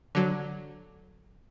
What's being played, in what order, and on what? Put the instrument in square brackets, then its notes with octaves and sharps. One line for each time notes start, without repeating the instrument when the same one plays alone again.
[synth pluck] D3 F#3